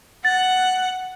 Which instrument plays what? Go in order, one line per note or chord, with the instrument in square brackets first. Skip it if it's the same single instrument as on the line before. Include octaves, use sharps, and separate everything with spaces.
[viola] F#5 [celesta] A6